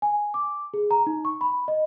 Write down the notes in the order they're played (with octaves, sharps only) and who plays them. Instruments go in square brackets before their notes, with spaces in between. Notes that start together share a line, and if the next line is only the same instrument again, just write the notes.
[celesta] G#5
D6
G#4
A#5
D#4
C#6
B5
D#5